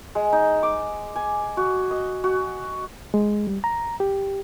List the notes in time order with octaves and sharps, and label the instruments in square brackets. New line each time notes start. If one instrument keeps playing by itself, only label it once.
[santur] G#3
D#4
D6
G#5
F#4
D#5
F#4
[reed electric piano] G#3
G3
A#5
G4